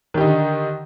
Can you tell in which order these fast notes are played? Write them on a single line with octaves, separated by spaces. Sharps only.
D#3 G4 D#4 D3